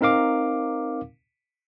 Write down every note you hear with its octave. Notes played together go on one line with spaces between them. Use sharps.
C4 D#4 A#4 F5 D6